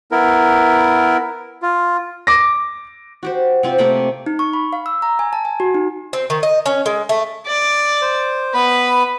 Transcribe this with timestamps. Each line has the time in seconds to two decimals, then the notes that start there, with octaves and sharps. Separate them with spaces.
0.12 B3 E4 A#4
1.62 F4
2.27 D6 A#6
3.23 F#4 G4 C5
3.63 C3 C4 F4
3.78 C3 A3 A#3 B5
4.26 D#4
4.39 C#6
4.53 B5
4.73 F5
4.86 E6
5.02 A#5
5.19 G#5
5.33 A5
5.45 G#5
5.60 F#4
5.74 D#4
6.13 C4
6.30 D#3
6.43 D#5
6.66 C#4
6.86 G#3
7.09 A3
7.46 D5
8.02 C5
8.54 B3 B4 B5